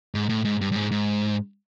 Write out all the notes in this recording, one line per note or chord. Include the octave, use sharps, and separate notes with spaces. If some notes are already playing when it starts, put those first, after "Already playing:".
G#2
A2
G#2
G2
G2
G#2
G#2